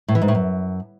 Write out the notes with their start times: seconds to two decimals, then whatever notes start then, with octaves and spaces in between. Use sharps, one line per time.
0.08 A2
0.15 E3
0.22 G#2
0.28 A2
0.35 F#2